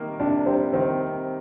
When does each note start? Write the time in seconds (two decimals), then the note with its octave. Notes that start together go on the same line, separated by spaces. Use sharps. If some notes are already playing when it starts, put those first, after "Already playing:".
Already playing: C3 D#3 G3 A#3
0.20 C3 D4
0.46 G3 C4
0.73 D#3 C4